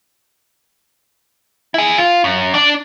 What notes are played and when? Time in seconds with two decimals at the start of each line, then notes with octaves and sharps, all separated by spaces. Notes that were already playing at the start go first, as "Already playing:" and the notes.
1.74 E4 G#4
1.98 F4
2.24 F#2
2.54 D4 D5